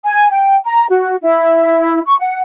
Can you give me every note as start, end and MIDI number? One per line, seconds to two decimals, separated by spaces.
0.05 0.29 80
0.31 0.55 79
0.66 0.85 82
0.89 1.16 66
1.22 2.00 64
2.07 2.15 85
2.20 2.41 78